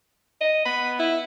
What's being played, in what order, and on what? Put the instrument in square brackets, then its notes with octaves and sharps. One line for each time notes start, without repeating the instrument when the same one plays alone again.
[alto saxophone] D#5
[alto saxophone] B3 [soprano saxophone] B5
[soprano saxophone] E4